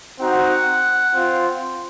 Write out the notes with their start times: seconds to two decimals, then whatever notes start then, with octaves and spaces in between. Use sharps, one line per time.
0.20 C4 D#4 F#4 F#5
1.14 C4 F4